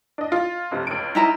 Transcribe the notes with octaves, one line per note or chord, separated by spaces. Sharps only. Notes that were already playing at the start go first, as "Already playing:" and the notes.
D4 D#5
F4
F1 C#2 C3
C#2 D7
D#4 E4 A#5